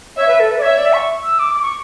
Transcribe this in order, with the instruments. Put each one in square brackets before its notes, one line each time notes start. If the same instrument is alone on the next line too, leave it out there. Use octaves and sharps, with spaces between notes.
[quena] C#5 [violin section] E5
[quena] B4
A4
B4
D5
[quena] C#5 [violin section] E5
[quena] D5
C#6
E6
D6
D6
C#6